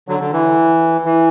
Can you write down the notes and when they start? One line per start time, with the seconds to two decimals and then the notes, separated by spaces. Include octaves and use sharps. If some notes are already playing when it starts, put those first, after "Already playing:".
0.08 D3 F#3
0.20 D3
0.33 E3
1.05 E3